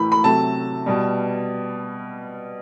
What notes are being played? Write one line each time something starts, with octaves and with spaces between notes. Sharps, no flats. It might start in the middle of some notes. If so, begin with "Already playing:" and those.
Already playing: A2 E3 A3 B5
B5
C3 F#3 A3 A5
B2 G3